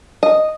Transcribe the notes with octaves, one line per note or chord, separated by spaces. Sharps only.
D#5